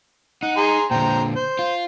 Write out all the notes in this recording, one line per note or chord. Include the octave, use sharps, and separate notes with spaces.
D#4 F#5
G#4 A#5 C6
A#2 D3 C5 G5 A#5
C5
F4